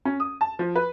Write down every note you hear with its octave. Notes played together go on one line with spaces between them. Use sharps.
C#4
D#6
A5
F3
B4